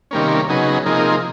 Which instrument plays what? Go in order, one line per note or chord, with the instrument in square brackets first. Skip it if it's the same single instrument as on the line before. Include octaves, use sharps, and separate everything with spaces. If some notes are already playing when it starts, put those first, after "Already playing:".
[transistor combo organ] C3 D#3 G3 A#3 C#4
C#3 F#3 B3 D#4 G#4
C3 F3 A#3 D#4 G#4